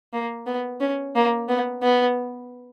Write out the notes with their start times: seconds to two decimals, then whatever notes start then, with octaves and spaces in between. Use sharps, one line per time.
0.13 A#3
0.46 B3
0.80 C#4
1.16 A#3
1.49 B3
1.83 B3